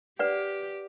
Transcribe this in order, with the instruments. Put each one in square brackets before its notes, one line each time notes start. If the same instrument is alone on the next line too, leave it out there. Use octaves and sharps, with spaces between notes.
[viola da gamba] G4 [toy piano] B4 D5 F#5